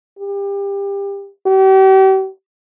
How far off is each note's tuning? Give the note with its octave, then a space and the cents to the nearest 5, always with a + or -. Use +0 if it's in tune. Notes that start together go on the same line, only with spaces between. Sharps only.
G4 +25
G4 -40